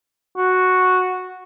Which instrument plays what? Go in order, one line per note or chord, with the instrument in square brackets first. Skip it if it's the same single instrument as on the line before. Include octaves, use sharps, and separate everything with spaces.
[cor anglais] F#4